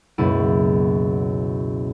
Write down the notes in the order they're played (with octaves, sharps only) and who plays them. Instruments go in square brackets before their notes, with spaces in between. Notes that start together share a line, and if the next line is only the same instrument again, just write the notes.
[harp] C#2 F#2 B2 A#3 E4 D#7